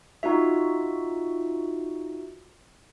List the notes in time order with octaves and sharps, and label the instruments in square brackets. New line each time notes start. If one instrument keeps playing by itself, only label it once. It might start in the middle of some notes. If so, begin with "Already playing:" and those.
[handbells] D#4 F4 F#4 E5